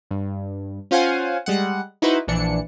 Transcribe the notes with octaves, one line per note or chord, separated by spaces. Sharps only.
G2
C#4 F4 C5 F5 F#5 G#5
G3 G#3 F#5
D#4 E4 F#4 B4 C5
A#1 E3 D4 C#7